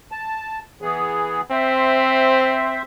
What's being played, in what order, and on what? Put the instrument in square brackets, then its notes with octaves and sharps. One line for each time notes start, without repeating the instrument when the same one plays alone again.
[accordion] A5
E3 B3 G#4
[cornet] C4 [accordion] C5 E5